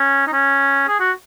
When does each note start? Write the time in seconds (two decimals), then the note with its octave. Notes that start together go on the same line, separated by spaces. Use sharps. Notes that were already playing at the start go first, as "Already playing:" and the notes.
Already playing: C#4
0.27 D#4
0.33 C#4
0.88 G#4
1.00 F#4